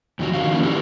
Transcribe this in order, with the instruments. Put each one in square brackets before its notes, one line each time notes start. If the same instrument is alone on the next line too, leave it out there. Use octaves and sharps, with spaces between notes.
[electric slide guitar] F2 D#3 F#3 A3 F#4
D3 D#3 D4 F#4 F5
D#3 F3 A#3 C#4 D4 E4
E4 F#4 G4 A4 B4